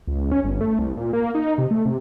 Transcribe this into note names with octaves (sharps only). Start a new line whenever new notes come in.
C#2
C#4
G1
A3
C2
A#2
A#3
D#4
C3
A3
C3